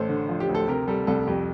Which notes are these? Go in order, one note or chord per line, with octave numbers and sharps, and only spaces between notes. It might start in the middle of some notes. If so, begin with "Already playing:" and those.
Already playing: A1 A4 C5
D3
F3
G4
D2
A4
C3 G4 A#4
G3 A4
C2 A4
F2 G4